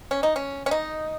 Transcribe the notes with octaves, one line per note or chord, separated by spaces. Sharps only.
C#4
D#4
C#4
C#4
D#4